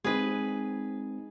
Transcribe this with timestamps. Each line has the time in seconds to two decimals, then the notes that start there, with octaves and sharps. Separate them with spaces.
0.04 G#3 C4 D#4 G#4 B4